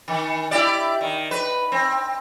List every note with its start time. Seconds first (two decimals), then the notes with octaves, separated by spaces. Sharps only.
0.08 D#3
0.51 E4 G4 D5
1.01 D#3
1.31 B4
1.72 C4